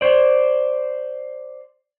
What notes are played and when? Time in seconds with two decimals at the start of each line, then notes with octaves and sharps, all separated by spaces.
0.01 C5 D5